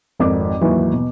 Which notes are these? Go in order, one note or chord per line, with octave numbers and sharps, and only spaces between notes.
G#1 F2 A#4 D6
D#2 G#2 E3 F#3
B2